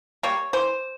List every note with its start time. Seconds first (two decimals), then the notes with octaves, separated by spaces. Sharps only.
0.23 G3 A#3 C#5
0.53 E3 C5